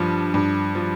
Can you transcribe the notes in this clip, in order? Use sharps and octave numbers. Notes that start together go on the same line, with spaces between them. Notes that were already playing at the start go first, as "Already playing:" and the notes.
Already playing: G2 F3
G2
F3